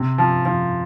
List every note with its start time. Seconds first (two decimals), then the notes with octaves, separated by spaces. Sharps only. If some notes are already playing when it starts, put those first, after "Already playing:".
Already playing: C3
0.18 F3
0.45 F3